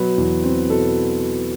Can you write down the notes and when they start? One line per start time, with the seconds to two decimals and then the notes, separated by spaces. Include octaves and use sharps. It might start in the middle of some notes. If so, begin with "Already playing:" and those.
Already playing: B2 F#3 B4
0.18 E2
0.43 C4
0.69 B2 A4